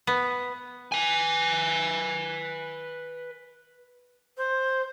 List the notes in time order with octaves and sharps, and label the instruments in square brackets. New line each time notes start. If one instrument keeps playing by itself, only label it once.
[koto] B3
[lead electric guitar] B4 G#5
[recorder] C5